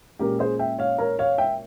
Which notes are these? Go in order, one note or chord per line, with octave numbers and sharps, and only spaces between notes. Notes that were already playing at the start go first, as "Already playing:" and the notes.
A#2 G#3 C#4 G4 A#4
G#4 C5
E5 G5
C#5 F5
A#4 C#5
C#5 F5
E5 G5